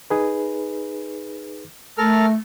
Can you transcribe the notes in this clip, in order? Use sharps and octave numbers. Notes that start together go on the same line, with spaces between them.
D#4 G#4 B4
A3 A4 A#4 F6